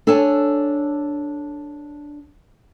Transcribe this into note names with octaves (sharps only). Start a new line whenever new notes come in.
D4 A4 C#5 G#5 A5